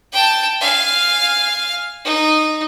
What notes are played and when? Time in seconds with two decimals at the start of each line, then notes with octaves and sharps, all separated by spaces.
0.13 G5 A5
0.61 F5 G#5
2.05 D#4